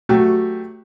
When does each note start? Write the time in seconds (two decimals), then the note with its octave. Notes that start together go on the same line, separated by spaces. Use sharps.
0.09 F#3 A3 F#4 G4